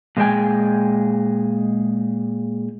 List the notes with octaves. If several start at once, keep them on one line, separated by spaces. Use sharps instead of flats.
A#2 G#3 B3 G5 G#5